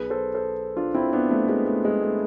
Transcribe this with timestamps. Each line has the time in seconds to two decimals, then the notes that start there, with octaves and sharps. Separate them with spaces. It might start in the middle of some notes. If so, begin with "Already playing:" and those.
Already playing: B1 B2 G#4 B4
0.10 A4 C5
0.35 A4 C5
0.76 D4 F4
0.94 C4 E4
1.13 B3 D4
1.31 A3 C4
1.48 G#3 B3
1.67 A3
1.85 G#3
2.02 A3